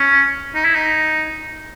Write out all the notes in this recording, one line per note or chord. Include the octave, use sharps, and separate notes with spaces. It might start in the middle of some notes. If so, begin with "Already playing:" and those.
Already playing: C#4
D#4
E4
D#4